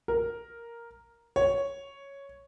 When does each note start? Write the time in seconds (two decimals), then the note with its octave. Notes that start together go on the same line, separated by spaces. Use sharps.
0.08 A#4
1.36 C#5